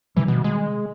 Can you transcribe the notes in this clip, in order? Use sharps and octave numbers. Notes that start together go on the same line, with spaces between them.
C3 D#3 E3 G3
B2
G#3